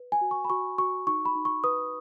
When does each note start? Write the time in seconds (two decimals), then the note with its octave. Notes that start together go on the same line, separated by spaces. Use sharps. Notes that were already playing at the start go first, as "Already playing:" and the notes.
Already playing: B4
0.12 G#5
0.21 F#4
0.31 C#6
0.45 B5
0.50 F#4 C#6
0.78 F#4 C#6
1.07 D#4 C#6
1.25 B5
1.35 D#4
1.45 C#6
1.64 B4 D#6